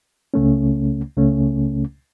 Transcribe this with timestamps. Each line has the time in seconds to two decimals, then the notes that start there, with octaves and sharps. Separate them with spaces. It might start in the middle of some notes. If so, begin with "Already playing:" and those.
0.34 C#2 C#3 A3 C#4
1.17 C#2 C#3 A3 C#4